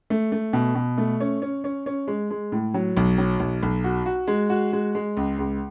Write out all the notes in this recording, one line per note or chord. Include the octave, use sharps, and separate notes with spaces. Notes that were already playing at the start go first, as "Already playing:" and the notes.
A3
A3
B2
B2
A3
C#4
C#4
C#4
C#4
G#3
G#3
A2
F#3
B1
F#3
B1
B1
F#4
F#4
G#3
F#4
G#3
G#3
C#2
C#2